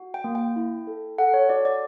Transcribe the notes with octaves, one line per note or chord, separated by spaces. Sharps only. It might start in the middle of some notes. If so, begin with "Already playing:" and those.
Already playing: F#4
G5
A#3
G5
E4
A4
A4 F#5
C#5
F#4 D5
D5